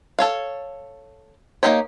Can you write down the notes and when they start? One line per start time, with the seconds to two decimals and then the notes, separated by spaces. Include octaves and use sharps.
0.19 A4 C#5 F5
1.63 A#3 C4 D#4 G4 C#5